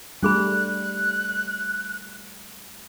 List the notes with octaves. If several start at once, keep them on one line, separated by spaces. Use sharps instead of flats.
G3 A3 D4 G#4 B5 F#6